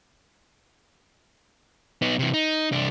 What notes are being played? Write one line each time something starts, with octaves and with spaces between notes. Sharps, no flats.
B3 D#4
C3 E3
D#4
C2 D4